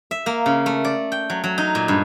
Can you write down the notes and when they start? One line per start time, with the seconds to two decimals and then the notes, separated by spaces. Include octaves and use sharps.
0.11 E5
0.26 A#3
0.46 C#3
0.66 A3
0.85 D5
1.12 G5
1.30 F#3
1.44 F#3
1.58 D#4
1.75 A#2
1.88 G2